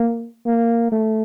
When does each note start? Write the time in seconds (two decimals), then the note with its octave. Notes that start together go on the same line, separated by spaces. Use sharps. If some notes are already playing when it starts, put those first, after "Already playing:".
Already playing: A#3
0.46 A#3
0.92 A3